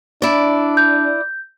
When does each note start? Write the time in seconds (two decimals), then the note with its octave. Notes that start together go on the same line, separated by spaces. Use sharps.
0.22 D4 E4 D5
0.77 G6